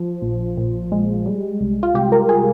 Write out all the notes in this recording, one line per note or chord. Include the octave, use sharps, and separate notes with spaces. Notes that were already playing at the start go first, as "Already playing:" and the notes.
Already playing: F3
A#1
A#2
G#3
G3
C2
F4
C3 G4
A#4
G#4